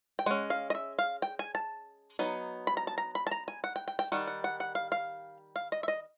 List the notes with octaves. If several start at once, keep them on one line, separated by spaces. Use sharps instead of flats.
G5
G#3 C#4 F#5
F5
D#5
E5
F5
G5
G#5
A5
F#3 B3 D#4
B5
A#5
A5
A#5
B5
A5
A#5
G#5
F#5
G5
G5
G5
D#3 G3 F#5
F#5
F#5
F#5
F5
F5
F5
D#5
E5
D#5